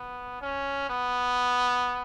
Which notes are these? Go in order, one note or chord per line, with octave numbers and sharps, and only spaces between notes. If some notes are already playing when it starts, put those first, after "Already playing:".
Already playing: B3
C#4
B3